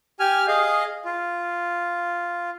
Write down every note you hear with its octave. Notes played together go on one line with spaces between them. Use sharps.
G4 G#5 F6
G#4 D#5 F5
F4